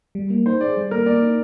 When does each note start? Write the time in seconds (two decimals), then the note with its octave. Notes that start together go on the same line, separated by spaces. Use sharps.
0.15 G3
0.30 A#3
0.46 D#4 C5
0.61 G#4 D5
0.77 G3
0.91 A#3 A#4
1.06 A#3 D5
1.22 D#4